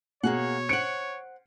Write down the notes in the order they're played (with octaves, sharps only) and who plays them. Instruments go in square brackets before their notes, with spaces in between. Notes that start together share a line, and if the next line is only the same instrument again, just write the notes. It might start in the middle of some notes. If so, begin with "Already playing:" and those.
[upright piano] B2 [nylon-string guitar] A#3 G#4 F#5 [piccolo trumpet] C#5
[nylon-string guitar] C5 F#5 [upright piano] C#7 D7